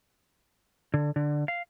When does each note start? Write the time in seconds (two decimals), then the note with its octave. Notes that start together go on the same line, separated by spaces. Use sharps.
0.94 D3
1.16 D3
1.48 F5